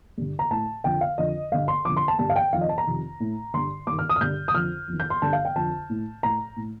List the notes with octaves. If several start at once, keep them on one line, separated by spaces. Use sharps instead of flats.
G2 D3
A#5
A2 A5
F2 D3 G5
F5
F2 D3 D#5
G2 D3 F5
C6
F2 D3 D6
C6
A5
G2 D3 A5
F5
G5
F2 D#3 F5
D#5
A5
A#5
F2 C3 D#3
A2
G2 D3 C6
G2 D#3 D6
F6
D#6
F6
G2 D3 G6
D#6
F2 D3 F6
F2 D#3
G6
C6
G2 D3 A5
F5
G5
F2 D3 A5
A2
A2 A#5
A2